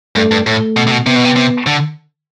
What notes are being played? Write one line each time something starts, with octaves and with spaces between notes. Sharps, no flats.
G2 A3
G2
A2 A3
B2
C3
B2
C3 B3
B2
C3
C3
D3